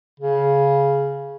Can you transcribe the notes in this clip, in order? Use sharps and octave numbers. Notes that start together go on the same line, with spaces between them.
C#3